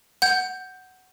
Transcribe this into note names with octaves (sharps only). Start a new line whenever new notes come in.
F#5 G6